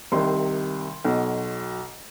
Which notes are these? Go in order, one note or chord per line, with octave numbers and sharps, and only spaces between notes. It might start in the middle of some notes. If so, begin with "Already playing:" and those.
C2 C3 D#3 C6
B1 B2